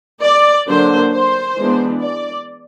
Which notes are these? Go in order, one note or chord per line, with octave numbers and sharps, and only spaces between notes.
D5
D3 F#3 A#3 D4 C5
C5
E3 G#3 B3 D4
D5